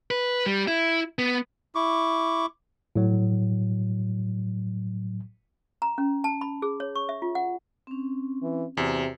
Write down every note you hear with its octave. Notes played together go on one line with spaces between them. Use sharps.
B4
G3
E4
B3
E4 C#6 D6
A2 F#3
A#5
C#4
A5
B5
G#4
C#5
C#6
E5
F4
F#5
C4 C#4
E3
E2 C3 F#4